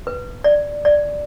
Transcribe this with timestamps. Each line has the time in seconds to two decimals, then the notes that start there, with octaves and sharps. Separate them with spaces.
0.07 B4
0.44 D5
0.85 D5